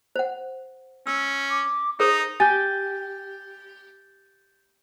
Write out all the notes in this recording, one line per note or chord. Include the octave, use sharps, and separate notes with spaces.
C5 F#5
C#4 E6
D6
D#4 G#4 A#4 C5 D#6
G4 G#5 G6 A6